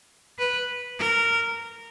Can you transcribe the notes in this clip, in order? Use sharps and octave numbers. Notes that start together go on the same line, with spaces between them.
B4
A#4